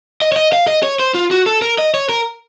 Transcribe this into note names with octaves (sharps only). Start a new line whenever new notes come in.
D#5
C#5
D#5
F5
D#5
C#5
C5
F4
F#4
A4
A#4
D#5
C#5
A#4